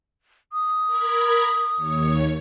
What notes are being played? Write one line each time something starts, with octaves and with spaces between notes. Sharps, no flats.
D#6
A#4 B5 G#6
D#2 C#5